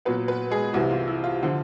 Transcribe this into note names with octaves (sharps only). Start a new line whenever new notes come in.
A#2 F#3 B3 B4
B3 B4
G#3 G#4
C2 C3 E3 F#3 F#4
F4
E4
F4
D3 F3